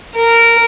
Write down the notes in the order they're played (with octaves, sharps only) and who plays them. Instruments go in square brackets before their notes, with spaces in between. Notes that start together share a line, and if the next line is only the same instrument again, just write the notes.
[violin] A#4